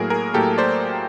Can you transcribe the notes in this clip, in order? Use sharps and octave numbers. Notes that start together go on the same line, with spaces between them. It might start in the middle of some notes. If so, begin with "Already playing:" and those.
Already playing: A2 F#3 A#3 G#4 A#4
G#4 A#4
A2 F#3 A#3 G4 A4
C5 D5